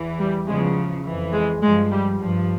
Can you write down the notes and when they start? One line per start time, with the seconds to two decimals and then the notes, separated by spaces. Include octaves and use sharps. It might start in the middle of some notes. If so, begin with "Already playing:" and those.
Already playing: E2 E3
0.19 G3
0.48 E2 C#3 F3 G#3
1.06 F2 E3
1.33 G#3
1.62 G2 F3 G#3
1.91 G3
2.20 G2 F3